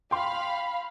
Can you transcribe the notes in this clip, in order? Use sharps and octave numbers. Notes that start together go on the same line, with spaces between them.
F5 G5 B5 C6